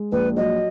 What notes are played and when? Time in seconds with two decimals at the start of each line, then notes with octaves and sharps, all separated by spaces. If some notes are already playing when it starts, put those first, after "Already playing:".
Already playing: G#3
0.12 A#1 B4
0.37 F#3 D#5